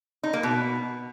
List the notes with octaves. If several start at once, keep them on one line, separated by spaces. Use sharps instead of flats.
D#4
A#3
B2